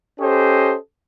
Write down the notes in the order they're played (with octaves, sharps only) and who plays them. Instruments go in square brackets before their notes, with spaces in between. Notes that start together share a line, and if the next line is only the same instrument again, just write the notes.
[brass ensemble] C#4 G4 A4 C5 D#5